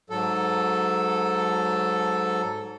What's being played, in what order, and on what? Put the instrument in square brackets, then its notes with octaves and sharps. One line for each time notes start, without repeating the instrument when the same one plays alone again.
[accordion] G#2 F#3 A4